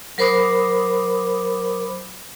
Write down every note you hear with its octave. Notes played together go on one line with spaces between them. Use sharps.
F#3 A#4 C5 B5 D6 D#6